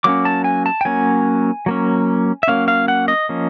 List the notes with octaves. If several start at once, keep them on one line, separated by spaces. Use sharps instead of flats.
F#3 A#3 C#4 D6
A5
G#5
A5
G5
F#3 A#3 C#4 G#5
F#3 A#3 C#4
E5
F#3 A#3 C#4 F5
F5
F#5
D#5
F3 A#3 C#4